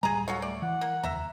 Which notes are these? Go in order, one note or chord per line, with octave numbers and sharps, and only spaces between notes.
D1 D#2 G3 G#4 G#5 A#5
F#4 A4 C#5 F5
A3 D5
E3 F#5
A#3
F1 D#2 E5 A#5